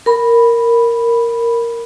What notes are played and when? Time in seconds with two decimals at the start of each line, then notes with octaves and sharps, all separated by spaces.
0.06 A#4 B5